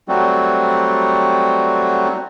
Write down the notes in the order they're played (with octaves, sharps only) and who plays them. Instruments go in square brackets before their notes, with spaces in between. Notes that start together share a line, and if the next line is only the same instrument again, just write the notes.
[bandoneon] F#3 G3 A3 C4 F#4